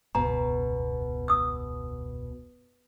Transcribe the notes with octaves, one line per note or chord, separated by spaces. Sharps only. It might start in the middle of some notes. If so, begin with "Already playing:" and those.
E1 C#2 F#2 B2 A#5
D#6 E6